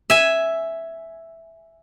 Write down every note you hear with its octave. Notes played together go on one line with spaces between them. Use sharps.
E5 G#5